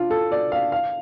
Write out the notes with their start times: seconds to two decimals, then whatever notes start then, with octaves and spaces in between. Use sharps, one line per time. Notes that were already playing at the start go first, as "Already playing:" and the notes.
Already playing: D4 F4
0.11 A4
0.32 D5
0.52 F5
0.72 F5